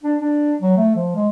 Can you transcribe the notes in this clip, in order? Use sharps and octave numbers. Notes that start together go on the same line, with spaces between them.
D4
D4
F#3
A3
F3
G#3